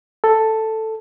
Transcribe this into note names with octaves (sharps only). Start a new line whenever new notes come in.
A4